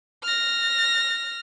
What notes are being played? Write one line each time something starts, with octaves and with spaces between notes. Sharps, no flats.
F6 A#6